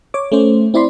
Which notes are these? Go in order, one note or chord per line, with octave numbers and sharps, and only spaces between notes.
C#5 D6
A3 C#4 C5
C4 E4 D5 B5 C6